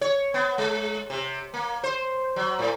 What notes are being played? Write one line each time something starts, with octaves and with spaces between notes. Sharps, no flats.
C#5
B3
G#3
C3
A#3
C5
F#3
A2